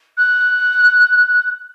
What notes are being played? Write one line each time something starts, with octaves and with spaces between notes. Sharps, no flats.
F#6